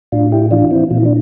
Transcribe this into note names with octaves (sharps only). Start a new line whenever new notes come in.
A2 D4 F4
E4 G4
E3 D4 F4
C4 E4
A#2 F4
E4
D4